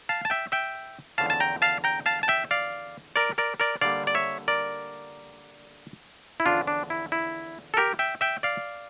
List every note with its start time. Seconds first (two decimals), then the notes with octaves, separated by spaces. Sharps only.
0.09 F5 A5
0.25 A5
0.30 E5 G5
0.52 E5 G5
1.18 E2 D3 F3 C#4 F5 A5
1.30 A5
1.40 G5 A#5
1.62 F5 A5
1.84 G5 A#5
2.06 F5 A5
2.23 A5
2.28 E5 G5
2.51 D5 F5
3.16 A#4 D5
3.38 A#4 D5
3.60 A#4 D5
3.81 D3 G3 A#3 D5 F5
4.07 D5
4.15 C#5 E5
4.48 A#4 D5
6.40 E4
6.46 E2 D3 F3 C#4 D4 F4
6.67 D4
6.90 E4
7.12 E4
7.74 A4
7.77 G4 A#4
7.99 E5 G5
8.21 E5 G5
8.43 D5 F5